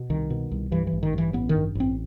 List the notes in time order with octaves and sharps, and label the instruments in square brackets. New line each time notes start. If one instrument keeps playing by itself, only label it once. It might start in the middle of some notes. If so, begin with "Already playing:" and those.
Already playing: [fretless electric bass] B2
C2 D#3
B2
C2
G2 E3
E3
A1
D#3
G2 E3
A1 B3
D#3
G2
A1 C4